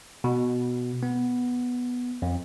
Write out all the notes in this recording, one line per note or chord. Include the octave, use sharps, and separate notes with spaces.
B2
B3
F2